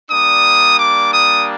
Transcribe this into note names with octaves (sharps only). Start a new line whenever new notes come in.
G3 A#3 D4 D#6
D6
D#6